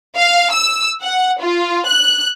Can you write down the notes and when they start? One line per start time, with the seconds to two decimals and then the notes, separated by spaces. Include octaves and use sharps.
0.16 F5
0.52 E6
1.02 F#5
1.40 F4
1.87 F#6